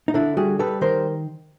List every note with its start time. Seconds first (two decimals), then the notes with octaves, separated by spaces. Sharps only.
0.08 D#4
0.14 D3 D4 E4
0.37 G3 F#4 G#4
0.59 G3 A4 B4
0.81 D#3 A#4 C5